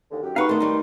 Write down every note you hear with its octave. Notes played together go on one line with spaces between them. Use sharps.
D#2 D3
F#2 G4
D#4 B4 F5 F#5 C#6
D3 D#3 A3 C6
G3 D#4